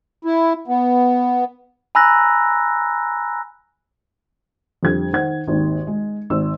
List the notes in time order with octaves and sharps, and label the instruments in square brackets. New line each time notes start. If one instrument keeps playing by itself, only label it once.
[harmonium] E4
B3
[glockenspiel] G#5 A#5 B5 E6 F#6 A#6
[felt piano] F2 D3 G3 G#6
D#3 C5 F#5 G#6
G#1 D#2
G#3
G#1 E6